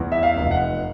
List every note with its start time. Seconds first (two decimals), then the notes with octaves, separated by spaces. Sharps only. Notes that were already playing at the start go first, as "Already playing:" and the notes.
Already playing: E2
0.12 E5
0.23 F5
0.36 F1
0.51 F#5